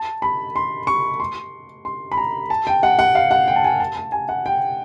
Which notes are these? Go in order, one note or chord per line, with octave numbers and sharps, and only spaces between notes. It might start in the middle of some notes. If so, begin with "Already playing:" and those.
Already playing: A5
B5
C6
C#6
C6
C6
B5
A#5
A5
G5
F#5
F#5
F5
F#5
G5
A5
G#5
A5
A5
G#5
F#5
G5